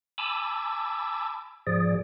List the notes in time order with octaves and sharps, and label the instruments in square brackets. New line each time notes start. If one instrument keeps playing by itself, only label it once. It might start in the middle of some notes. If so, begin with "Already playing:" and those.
[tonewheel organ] G#5 A5 B5 D6 E6
G#2 F3 G#4 D5